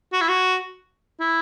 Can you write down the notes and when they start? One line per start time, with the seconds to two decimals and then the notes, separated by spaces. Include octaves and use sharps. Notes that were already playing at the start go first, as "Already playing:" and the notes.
0.13 F#4
0.21 E4
0.29 F#4
1.20 E4